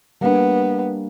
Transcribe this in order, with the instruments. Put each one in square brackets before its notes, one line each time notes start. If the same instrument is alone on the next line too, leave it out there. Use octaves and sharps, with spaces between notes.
[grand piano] G3 A#3 D4 [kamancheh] B3